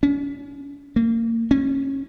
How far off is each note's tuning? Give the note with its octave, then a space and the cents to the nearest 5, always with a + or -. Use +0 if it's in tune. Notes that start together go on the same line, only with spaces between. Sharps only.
C#4 +35
A#3 -30
C#4 -25